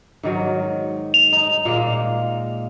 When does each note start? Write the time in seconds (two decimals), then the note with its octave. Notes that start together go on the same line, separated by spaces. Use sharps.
0.23 G#2 D#3 F#3
1.14 F7
1.32 D#4
1.65 A#2 G#3 A#3